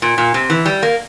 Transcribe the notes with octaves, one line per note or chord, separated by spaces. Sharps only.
A#2
A#2
C3
E3
G3
A#3